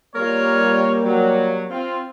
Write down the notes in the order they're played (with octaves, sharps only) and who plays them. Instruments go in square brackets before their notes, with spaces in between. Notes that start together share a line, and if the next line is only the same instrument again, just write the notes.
[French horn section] G3 A#3 [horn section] F4 A#4 C#5
[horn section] F#3
C4 F4